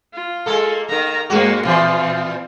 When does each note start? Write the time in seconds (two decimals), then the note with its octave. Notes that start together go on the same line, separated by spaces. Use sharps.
0.13 F4
0.46 G#3 A#3 A4
0.89 D#3 A#3 A#5
1.30 G2 G#3 A#3 F#4
1.65 A#2 E3 F3 C4 F4